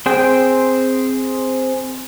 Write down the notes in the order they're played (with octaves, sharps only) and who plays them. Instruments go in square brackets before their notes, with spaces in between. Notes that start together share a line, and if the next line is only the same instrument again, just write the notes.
[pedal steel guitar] C4 G#4 G5